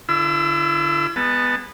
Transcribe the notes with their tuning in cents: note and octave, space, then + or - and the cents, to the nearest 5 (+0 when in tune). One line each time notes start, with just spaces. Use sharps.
D3 +0 E4 +45 E6 +0
G#3 -25 B3 +0 A5 +15